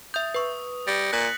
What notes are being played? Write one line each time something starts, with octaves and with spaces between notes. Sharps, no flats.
E5 D#6 G6
B4 C#6
G3 A6 A#6 C#7
A#2 F#6 B6 F#7